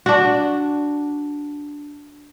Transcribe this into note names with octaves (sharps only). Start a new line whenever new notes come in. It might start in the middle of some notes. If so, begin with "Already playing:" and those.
D4 F#4